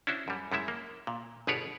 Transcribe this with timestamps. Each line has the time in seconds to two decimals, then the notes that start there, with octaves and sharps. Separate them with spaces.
0.07 C#4 D4 E4 F#4 C5
0.28 F#2 G3
0.52 F#2 G3 G#3 E4 E5
0.68 A#3
1.07 A#2
1.47 G1 B2 G#4 B4 C#5 D5